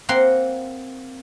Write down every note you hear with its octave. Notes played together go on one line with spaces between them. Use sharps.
A#3 C4 F#5 C6